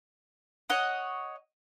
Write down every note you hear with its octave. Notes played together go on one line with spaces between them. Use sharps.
C#5 D#5 F#5